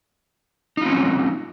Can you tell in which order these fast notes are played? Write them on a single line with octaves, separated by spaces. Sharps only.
D#4 F4 C4 C#4 F#3